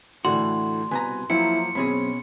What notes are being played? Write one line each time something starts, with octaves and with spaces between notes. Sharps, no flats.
A2 D3 E3 F#4 C6
C2 B2 B4 G#5 A#5
F3 F#3 A#3 E4 C#7
F#2 B2 C4 C#4 G#4 B5